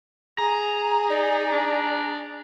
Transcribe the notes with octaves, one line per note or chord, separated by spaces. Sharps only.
G#4 A#5
D#4 D5
D4